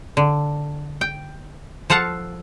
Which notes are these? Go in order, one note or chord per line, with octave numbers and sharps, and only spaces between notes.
D3
G5
F3 A4 F5 F#5 A5